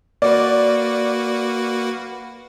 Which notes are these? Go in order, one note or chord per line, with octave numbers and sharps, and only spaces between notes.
A#3 F#4 B4 D5